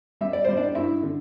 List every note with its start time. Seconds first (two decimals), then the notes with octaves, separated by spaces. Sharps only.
0.21 G3 E5
0.33 D5
0.45 G3 C5
0.56 D4 D5
0.75 G2 E4 E5
1.03 D3